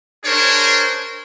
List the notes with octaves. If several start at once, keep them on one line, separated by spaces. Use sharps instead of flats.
D4 G#4 A#4 C5 C#5